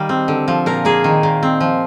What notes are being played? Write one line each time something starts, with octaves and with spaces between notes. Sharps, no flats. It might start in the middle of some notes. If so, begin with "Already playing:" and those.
Already playing: D#3 G3 D#5 F5
C4
D3
F3
A#2 A#4
A#3 G#4
D#3
A#2
C4
F3